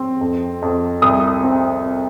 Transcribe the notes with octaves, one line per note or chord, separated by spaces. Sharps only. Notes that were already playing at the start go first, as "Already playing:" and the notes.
Already playing: C4
F2
F2
C2 D#6
C4